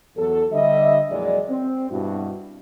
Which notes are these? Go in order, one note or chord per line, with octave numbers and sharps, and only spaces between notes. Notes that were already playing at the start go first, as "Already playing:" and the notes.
E2 F#3 A4
D3 G3 D#5 E5
F2 A#2 E3 F#3 G#3 D5
C4
G2 B2 E4 F#4